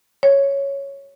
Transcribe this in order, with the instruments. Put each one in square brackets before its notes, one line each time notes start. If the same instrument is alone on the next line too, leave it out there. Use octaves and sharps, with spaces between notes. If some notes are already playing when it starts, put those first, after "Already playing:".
[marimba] C#5